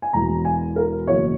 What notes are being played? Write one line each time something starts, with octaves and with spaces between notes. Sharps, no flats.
G#5
E1 E2 B2 A#5
G#5
A#4
F#1 E2 B2 C#5